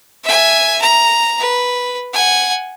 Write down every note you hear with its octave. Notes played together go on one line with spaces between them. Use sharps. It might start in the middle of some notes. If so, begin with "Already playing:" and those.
E5 G#5
A#5
B4
F#5 G#5